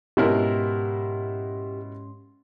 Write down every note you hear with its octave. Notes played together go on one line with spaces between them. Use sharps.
G#2 B2 C#4 E4 G4 A#4 C6